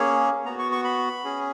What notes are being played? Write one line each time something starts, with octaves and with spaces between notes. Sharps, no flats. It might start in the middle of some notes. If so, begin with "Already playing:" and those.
Already playing: A#3 C#4 G#4 C#5
B3 F#4 A#5
C#6
C#6
B5
C#4 G#4